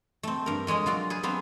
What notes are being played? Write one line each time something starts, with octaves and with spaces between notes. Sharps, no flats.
A3 C4
G2 A#4
F2 G#3 C#5 D#5
F#3 F4 F#4 D5
G#4 B4
F#3 B3 C4 D4 F5